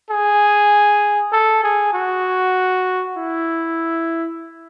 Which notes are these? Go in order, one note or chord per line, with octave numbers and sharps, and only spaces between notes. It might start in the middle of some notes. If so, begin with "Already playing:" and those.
G#4
A4
G#4
F#4
E4